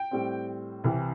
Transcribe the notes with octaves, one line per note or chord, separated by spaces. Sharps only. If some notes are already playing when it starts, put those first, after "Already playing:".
Already playing: G5
A2 G3 C4
C2 C3 E3